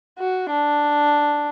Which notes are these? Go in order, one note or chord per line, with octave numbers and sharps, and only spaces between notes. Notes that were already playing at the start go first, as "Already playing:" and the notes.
F#4
D4